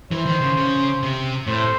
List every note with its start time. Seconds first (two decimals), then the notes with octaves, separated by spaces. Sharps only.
0.11 E3 C5
0.26 D#3
0.41 C#3
0.57 C#3
1.03 C3
1.47 A2 C5